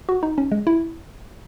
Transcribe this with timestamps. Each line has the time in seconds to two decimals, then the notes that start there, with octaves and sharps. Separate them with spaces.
0.09 F#4
0.23 D#4
0.38 C#4
0.52 G#3
0.67 E4